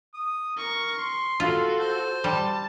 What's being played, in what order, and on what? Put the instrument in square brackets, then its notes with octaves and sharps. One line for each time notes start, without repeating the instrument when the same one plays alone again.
[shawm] D#6
[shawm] A#4 [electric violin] C#6
[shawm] C6
[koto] F4 [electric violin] F#4 A4
[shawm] C5
[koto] G3 [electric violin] A5